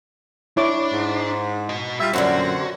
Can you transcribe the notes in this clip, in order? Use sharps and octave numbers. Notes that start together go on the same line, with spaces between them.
D4 E4 C#5 D6
G#2
F#4 D#5
G3 F4 E5
F#2 A#2 D3 F#3 C4 D4 F#4